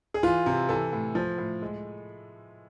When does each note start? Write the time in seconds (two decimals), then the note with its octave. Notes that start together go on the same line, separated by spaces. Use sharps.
0.14 G#4
0.23 E3 F4
0.46 C3
0.69 E3 A4
0.93 A2
1.15 F3
1.38 A2
1.62 G#3